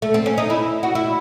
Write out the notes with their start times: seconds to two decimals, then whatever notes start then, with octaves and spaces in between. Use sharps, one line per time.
0.02 A3
0.14 C4
0.26 C#4
0.38 D#4
0.50 E4
0.83 F#4
0.95 E4